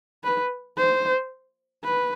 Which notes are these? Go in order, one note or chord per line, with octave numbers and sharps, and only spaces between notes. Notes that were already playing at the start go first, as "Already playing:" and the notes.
B4
C5
B4